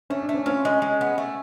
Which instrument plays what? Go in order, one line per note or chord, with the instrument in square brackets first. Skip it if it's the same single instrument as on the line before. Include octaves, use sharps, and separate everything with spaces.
[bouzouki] A3 [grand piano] C#4
[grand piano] D4
[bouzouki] A3
[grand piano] C#4
[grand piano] C#4 [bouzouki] F4
[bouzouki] G#3
G#3
B3
A3